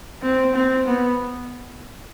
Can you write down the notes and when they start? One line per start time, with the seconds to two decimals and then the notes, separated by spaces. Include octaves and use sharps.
0.22 C4
0.54 C4
0.86 B3